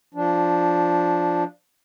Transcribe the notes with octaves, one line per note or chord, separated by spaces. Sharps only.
F3 D4